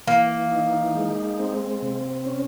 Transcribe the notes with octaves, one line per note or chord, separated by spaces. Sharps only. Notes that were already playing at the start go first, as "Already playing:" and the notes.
E3 A#3
D#4
G#3
C4
C3
C#4